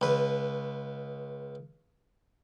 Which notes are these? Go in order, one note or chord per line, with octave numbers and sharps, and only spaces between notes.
C#2 B4